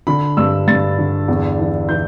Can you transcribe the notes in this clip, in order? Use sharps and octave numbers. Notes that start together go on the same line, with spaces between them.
D3 B5
G2 E6
G2 A6
D3
E2
E3
E3 G6